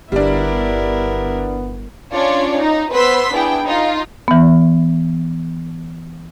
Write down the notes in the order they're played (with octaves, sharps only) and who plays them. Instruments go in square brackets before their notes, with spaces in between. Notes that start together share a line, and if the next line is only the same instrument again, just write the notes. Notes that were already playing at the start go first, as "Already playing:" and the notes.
[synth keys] G1 [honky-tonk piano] G3 D4 [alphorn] B3 [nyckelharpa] E4 A#4
[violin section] C#4 D4 F4 C#5 D5
D#4
B3 B4 C5 C6 E6 B6
B3 D4 E4 G#4 G5
D#4 F4
[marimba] E3 B3